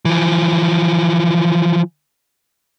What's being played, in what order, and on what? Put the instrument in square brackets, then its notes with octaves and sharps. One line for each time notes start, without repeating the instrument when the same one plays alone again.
[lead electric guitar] E3 F3